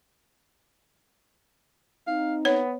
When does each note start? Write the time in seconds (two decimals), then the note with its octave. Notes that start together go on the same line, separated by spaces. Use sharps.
2.07 C4 D#4 F5
2.45 B3 C#5